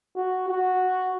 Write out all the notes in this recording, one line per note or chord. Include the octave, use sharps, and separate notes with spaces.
F#4
F#4